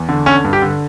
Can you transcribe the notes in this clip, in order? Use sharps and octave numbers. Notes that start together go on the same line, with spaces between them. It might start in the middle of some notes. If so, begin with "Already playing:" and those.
Already playing: E2
D3
D3 C#4
G2
G4
D3